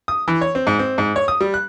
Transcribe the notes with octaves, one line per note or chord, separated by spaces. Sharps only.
D#6
E3
C#5
C4
G#2
C4
G#2
C#5
D#6
G3
F#6